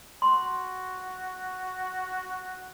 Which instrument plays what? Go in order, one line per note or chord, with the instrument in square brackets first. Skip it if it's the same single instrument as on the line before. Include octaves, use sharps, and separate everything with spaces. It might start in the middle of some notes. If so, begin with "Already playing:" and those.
[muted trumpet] F#4 [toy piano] C6